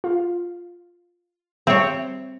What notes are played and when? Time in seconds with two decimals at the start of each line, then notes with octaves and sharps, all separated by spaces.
0.04 F4
1.67 G3 C4 C#5 E5